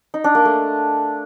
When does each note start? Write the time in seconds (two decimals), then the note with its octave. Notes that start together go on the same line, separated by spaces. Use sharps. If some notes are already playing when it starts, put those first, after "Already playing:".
0.14 D#4
0.24 D4
0.35 A#3
0.45 A3